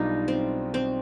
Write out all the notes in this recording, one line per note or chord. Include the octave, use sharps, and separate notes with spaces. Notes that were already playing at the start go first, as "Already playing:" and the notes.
Already playing: B1 B2 G3 D4 D#4 F4
C4
C4